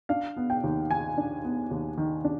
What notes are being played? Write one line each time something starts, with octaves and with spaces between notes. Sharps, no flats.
D4 F5
B3
G5
D#2
D#3 G#5
D4
B3
D#2
D#3
D4